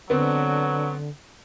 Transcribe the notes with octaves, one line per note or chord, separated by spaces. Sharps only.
D3 F#3 B3 C4